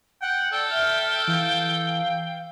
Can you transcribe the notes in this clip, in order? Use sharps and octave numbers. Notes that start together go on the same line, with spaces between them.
F#5 G5
A4 D5 G5
E5 F6
E3 F5